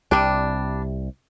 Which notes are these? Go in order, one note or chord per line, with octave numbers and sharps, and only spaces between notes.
C2 C3 G3 D4